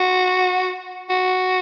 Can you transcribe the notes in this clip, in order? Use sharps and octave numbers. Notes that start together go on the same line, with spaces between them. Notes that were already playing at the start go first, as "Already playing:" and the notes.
Already playing: F#4
F#4